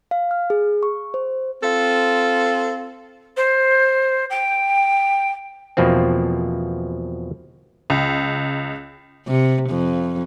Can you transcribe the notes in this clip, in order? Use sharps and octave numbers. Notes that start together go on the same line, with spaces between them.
F5
F6
G#4
C#6
C5
C4 F4 A4
C5
G5
E2 B2 F3 A#3 C4
C#2
C3
F2